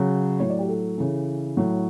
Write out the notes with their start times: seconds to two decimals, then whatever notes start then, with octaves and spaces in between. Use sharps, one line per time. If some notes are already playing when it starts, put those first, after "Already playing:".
Already playing: C#3 F#3
0.40 A2 F#3 C#5
0.49 D5
0.59 G4
0.69 A4
0.98 C#3 E3
1.57 A2 F#3